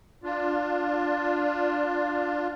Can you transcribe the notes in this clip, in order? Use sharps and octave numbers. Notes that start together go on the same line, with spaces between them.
D4 F4